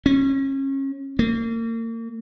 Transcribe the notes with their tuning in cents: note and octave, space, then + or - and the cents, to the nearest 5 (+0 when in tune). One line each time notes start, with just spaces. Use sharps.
C#4 -30
A#3 -35